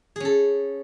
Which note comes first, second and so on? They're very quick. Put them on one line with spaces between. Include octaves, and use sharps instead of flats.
G#4 C#4 A4